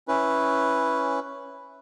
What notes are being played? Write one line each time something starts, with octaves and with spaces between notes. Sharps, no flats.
C#4 E4 B4